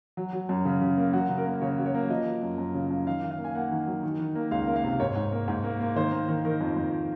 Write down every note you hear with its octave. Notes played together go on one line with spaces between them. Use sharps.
F#3
F#3
F#2
C#3
C#3
A#3
F#3 F#4
C#3
A#4
A#3
C#3 C#5
F#3
C#5
A#3
F3 D#5
F3
F#2
F#2
C#3
F#2
D#3 F5
D#3
F5
A#3
G#5
A#3 F#5
D#3
F#3
D#3
D#3
A#3
C#2 F5
A#3
F5
C3
G#2 C#5
G#2
A#3
G#2
A#3
A#3
D#3 C5
A#3
D#3
D#3 A#4
F2
F2